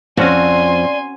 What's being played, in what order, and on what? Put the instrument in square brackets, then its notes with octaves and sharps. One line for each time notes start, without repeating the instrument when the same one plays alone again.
[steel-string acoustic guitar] F2 [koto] C4 C#4 F#4 [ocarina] D5 [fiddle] G#5 C6